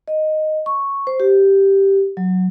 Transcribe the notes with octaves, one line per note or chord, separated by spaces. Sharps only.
D#5
C#6
C5
G4
F#3